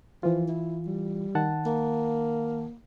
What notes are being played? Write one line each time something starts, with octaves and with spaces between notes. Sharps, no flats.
E3 F3 F4
E4
G3
D#3 F#5 A5
A#3